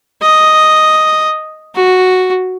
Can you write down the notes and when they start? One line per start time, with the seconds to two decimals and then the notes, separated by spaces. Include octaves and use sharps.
0.22 D#5
1.75 F#4